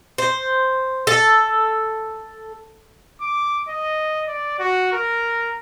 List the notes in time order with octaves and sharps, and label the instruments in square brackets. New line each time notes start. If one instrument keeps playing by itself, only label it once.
[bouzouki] C5
A4
[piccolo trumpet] D6
D#5
D5
F#4
A#4